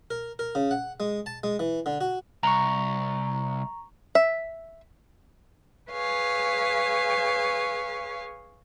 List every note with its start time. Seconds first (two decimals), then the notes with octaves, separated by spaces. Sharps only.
0.11 A#4
0.39 A#4
0.55 C#3
0.71 F#5
1.00 G#3
1.26 A5
1.43 G#3
1.59 E3
1.86 D3
2.01 F#4
2.43 C2 A#5 C#6
4.15 E5
5.90 G#4 B4 C#5 F5 G#5